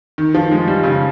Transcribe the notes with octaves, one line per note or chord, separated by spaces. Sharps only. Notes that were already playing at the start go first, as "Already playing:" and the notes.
D#3
F3
G#3
G3
C#3